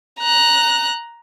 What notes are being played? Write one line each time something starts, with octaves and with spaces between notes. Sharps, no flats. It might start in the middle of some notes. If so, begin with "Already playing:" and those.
A#5 F#6